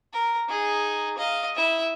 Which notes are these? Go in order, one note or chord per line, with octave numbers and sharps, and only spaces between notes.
A#4
D#4 G#4
D#5 F5
E4 E5